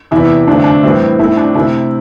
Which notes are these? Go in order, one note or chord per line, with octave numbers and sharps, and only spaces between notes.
E2 C3 E3 E4
G2 D3 A3 C4 D4
D4
A2 E3 G3 C4 E4
A2 A3 C4 E4
D4
C3 A3 C4 E4